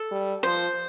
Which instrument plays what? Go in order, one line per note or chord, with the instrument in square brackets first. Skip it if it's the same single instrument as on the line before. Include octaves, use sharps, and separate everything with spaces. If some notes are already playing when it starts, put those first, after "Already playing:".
Already playing: [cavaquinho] A4
[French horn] G3
[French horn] F3 [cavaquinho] C5